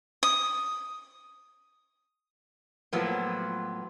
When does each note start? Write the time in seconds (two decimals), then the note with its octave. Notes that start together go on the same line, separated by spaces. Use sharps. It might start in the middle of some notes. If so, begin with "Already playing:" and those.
0.23 D#6
2.92 A2 F3 F#3 A#3 B3